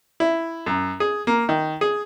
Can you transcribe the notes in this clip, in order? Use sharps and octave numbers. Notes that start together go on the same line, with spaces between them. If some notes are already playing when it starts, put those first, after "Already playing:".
E4
F#2
G#4
A#3
D#3
G#4